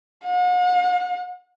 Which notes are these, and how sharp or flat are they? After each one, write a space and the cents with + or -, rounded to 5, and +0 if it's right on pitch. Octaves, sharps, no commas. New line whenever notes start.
F#5 -45